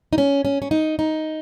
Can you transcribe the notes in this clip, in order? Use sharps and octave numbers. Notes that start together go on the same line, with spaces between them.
D#4
C#4
C#4
C#4
D#4
D#4